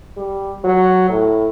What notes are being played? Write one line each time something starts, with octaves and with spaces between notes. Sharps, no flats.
G3
F#3
A2